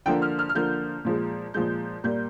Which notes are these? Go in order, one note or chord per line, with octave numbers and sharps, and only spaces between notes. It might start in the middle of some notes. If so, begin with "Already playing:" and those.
D3 F3 A#3 G5
F6
F6
F6
D3 F3 A#3 G6
A#2 F3 G#3
A#2 F3 G#3 G6
A#2 G3 A#3 G6